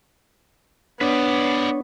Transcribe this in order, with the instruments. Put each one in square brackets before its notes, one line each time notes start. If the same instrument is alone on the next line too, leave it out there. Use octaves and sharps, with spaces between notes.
[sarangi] B3 [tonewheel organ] D4 C#5 [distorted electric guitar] B4 D5